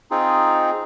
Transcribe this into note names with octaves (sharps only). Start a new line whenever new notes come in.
C4 D#4 F4 G#4